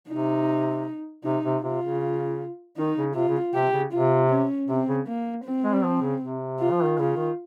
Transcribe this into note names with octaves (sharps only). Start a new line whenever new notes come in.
C3 D#4
C3 D#4
C3
C3 F4
C#3
D#3 D#4
C#3
C3 F4
C#3
C3 G4
C#3
C3 F4
C#4
C3 C4
C#3
A#3
C4
G#3
G3
F3
C#3
C3
F4
F3
D#3
C#3 F4
D#3